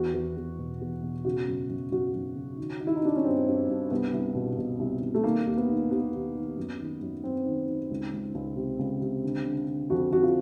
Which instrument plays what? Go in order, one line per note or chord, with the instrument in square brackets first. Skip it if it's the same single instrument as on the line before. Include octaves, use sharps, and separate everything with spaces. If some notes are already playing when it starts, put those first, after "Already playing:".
Already playing: [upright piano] E2 F#4
E2
E2
B2
E2
B2
C#3 F#4
F#2
F#2
F#2 F#4
F#2
C#3
D#3
D#3
E4
D#4
D#3 D4
C#4
G2 C4
G2
G2
C2 B3
C2
B2
B2
C2
C2
A3
D#3 A#3
D#2
B3
D#3
D#2 B3
D#2
D#3
F#2
D#3
F#2
F#2 C4
D#3
D#3
C#2
C#2
C#2
C3
C#2
C3
D3
D3
D3
F2 F#4
F2 F#4
F4